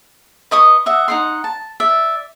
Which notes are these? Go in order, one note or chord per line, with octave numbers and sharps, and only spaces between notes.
B4 D#5 C#6 D#6
D#5 E5 F#5
D#4 F#5 C6
A5
D5 E5